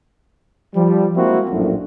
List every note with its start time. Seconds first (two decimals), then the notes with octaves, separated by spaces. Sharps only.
0.75 F3 G3
1.16 F3 G#3 A#3 C4 E4 F#4
1.50 A#1 F#2 A2